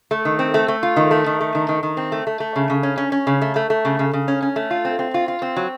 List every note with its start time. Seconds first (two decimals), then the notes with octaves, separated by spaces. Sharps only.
0.11 A3
0.25 D#3
0.39 C4
0.54 A3
0.68 A3
0.83 F4
0.96 D#3
1.11 A3
1.26 D#3
1.41 A3
1.55 D#3
1.69 D#3
1.83 D#3
1.97 C4
2.12 A3
2.27 A3
2.40 A3
2.56 C#3
2.70 C#3
2.83 C#4
2.98 C#4
3.12 C#4
3.27 C#3
3.41 A3
3.56 A3
3.70 A3
3.85 C#3
3.99 C#3
4.13 C#3
4.28 C#4
4.42 C#4
4.56 A3
4.71 F4
4.85 C4
4.99 C4
5.14 F4
5.28 F4
5.42 C4
5.57 F#3